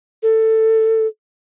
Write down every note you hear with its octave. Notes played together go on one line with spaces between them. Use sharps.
A4